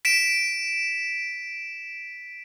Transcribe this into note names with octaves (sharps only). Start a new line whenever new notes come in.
B6 D7 E7